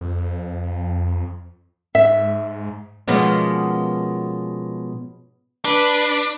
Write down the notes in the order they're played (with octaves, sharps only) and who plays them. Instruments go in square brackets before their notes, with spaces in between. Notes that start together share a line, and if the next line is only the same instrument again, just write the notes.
[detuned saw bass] F2
[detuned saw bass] G#2 [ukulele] E5
[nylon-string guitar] B2 F3 G#3 A#3 B3 C#4
[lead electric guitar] D4 [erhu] B4